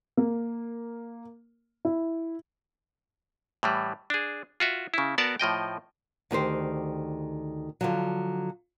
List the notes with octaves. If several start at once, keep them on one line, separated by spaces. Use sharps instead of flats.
A#3
E4
A2 E3 G3
D4 G#4
F4 F#4 E5
C#3 E4
B3 F#4 A#4 D5 A5
A2 F3 D#5 G5
D2 D#3 G4 C5
D3 F3 F#3